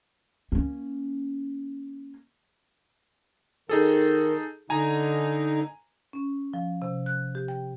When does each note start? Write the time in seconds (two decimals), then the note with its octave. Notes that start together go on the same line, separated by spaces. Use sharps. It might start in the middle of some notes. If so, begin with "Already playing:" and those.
0.52 A#3 C#4
3.69 D#3 D#4 G#4 A4
4.70 D3 D#4 G#5 A#5
6.13 C#4
6.53 F3
6.82 C3
7.06 F#6
7.35 G4
7.48 G5